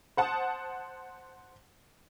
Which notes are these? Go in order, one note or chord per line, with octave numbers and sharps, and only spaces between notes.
C5 F#5 A5 D#6